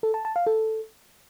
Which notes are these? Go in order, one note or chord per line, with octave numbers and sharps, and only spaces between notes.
A4
A5
A5
F5
A4